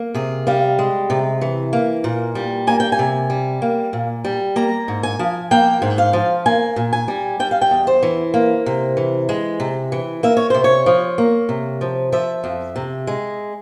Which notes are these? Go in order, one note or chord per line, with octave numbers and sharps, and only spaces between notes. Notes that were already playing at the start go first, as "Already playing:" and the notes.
Already playing: A#3
C3 G#4
G3 F5
G#3
C3
E3
A#3
A#2
G3
A#3 G#5
G5
G#5
C3
G3
A#3
A#2
G3
A#3 A#5
G#2
G#5
F3
A#3 G5
G#2
F5
F3
A#3 G#5
A#2
G#5
G3
G3 G5
F5
G5
E2
C5
E3
A#3
C3
E3
G#3
C3
E3
A#3 E5
C#5
C3 C5
C#5
F3
A#3
C3
F3
F3 E5
F2
C3
G#3